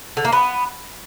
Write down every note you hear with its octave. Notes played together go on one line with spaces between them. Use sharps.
D3
A#3
B3